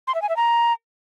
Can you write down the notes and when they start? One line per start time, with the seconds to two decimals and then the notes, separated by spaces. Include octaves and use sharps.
0.07 C6
0.15 E5
0.22 G#5
0.29 E5
0.36 A#5